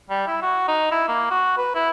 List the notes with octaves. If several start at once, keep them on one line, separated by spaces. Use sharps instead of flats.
G3
E4
F#4
D#4
E4
A#3
F#4
B4
E4